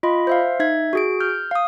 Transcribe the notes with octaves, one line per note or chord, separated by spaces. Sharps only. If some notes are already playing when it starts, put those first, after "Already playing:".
F4 D#5 B5
C5 E5 F5
D#4 E5 G#6
F#4 G#4 D7
F6 G6
F5 D#6